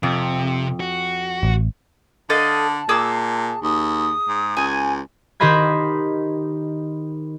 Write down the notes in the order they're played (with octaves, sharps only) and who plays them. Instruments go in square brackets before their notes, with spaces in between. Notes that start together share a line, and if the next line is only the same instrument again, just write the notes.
[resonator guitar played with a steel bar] F2 [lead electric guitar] C3
[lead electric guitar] F#4
[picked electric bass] A1
[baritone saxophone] D3 [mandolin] A4 D#5 F5 [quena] A5
[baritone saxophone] A#2 [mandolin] G#4 D6 E6
[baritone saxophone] D#2 [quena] D#6
[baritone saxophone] G#2
[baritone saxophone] C#2 [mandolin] G#5
[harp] D#3 G4 C5 D#5 B5 G#6